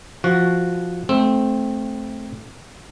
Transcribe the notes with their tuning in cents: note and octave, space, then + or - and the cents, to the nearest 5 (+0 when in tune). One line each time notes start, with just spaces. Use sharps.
F3 +0 F#4 -5
A3 -15 C4 +0